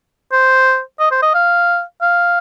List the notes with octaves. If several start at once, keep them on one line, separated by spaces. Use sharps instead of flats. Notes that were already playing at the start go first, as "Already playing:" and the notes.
C5
D#5
C5
D#5
F5
F5